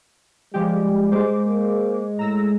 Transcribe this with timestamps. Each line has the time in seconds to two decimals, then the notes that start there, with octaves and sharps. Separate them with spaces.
0.54 F3 G3 G#3 G4
1.12 G#3 C5 D6
1.46 A#3
2.19 A2 A#5 E6 A#6